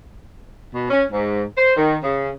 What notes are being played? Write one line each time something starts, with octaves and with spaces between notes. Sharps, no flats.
B2
C#4
G#2
C5
D#3
C#3